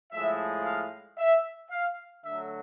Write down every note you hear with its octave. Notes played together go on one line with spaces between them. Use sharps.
A2 F3 G#3 E5
F5
E5
F5
D3 F#3 A3 E5